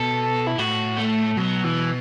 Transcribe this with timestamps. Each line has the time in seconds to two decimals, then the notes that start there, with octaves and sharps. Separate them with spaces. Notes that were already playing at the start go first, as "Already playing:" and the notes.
Already playing: B2 A4
0.47 E4
0.58 A2 F#4
0.98 A3
1.37 B2 F#3
1.64 E3